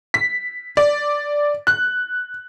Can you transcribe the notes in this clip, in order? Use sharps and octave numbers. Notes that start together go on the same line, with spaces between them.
B6
D5
F#6